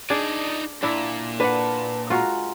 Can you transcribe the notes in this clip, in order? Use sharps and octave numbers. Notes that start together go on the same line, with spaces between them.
D4 D#4 G#4 D5
A#2 D4 E4
D4 B4 F#5 A5
G#3 F4 F#4 A#5